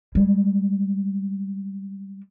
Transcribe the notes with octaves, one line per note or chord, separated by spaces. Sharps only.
G3 G#3